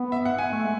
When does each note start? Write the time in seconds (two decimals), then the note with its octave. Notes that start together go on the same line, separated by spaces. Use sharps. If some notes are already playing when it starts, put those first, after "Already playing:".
Already playing: B3
0.12 E5
0.25 F#5
0.38 G#5
0.52 A3
0.63 G#3